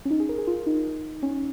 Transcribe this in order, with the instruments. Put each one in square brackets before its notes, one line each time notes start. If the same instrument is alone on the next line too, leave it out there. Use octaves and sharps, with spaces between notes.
[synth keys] C#4
D#4
G#4
A#4
G#4
F4
D#4
C#4